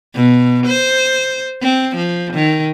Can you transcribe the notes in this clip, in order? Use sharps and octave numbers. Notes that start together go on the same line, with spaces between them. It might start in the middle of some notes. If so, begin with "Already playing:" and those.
B2
C5
C4
F3
D#3